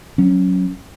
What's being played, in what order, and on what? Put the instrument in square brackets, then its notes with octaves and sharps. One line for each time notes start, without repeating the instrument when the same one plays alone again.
[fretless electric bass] F#3 C#4